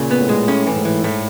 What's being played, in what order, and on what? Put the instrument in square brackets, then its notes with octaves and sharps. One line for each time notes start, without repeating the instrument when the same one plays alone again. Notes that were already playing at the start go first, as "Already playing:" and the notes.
Already playing: [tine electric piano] A#2 [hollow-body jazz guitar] C#3
[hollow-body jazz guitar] B3
[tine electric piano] A2
[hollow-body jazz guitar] G#3
[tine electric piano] A2 [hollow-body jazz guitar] C#4
[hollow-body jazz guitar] E3
[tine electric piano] G#2
[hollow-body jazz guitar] E3
[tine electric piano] A2 [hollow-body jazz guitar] A3